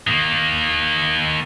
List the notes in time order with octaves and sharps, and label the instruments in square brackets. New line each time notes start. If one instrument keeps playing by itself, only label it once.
[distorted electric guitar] D#3 A#3